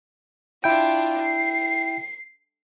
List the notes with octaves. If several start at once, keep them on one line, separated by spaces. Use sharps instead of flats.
D4 E4 F4 G5
C7